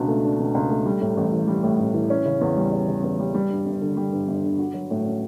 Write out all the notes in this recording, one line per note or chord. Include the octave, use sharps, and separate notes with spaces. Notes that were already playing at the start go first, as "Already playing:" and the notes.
Already playing: C#2 B2 D4
A3
D4
B2
C#2
A3
G3
A2
A1
E3
G3
A2
A1
E3
C#4
C#3
E2
G3
C#4
C#3
E2
G3
G3
G2
G1
D3
G3
G2
G1
D3
F#4
F#3
A2
C#4